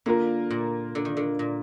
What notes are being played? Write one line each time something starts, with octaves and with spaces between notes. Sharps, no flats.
D3 A#3 F4 A#4
A#2
D3
D#3
D3
A#2